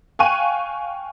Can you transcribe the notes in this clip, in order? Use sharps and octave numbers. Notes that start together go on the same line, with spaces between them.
F5 G5 G#5 C#6 F#6 D#7